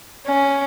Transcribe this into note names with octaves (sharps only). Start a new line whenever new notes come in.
C#4